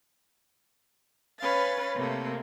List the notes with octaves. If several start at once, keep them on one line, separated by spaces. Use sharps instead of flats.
C#4 B4 F5 A6
C3 A3 A#3